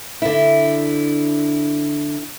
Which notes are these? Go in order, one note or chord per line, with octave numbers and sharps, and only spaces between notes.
D3 E4